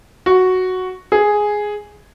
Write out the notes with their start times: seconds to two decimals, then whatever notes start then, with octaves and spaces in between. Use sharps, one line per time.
0.26 F#4
1.12 G#4